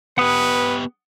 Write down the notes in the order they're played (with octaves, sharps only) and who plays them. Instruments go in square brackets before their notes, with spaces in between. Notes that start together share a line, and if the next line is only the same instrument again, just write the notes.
[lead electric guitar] B3 G4 [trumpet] B4 [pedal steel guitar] F#5 D#6